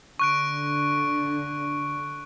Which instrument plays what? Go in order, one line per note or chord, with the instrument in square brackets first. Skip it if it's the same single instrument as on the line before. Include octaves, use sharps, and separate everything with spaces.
[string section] D3 [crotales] C#6 F#6 D7